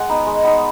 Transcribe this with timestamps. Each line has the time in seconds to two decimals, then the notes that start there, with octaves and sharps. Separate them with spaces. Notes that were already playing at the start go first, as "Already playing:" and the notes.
Already playing: G#3 F#5 G#5
0.09 B3 D#4
0.27 G#3
0.44 B3 D#4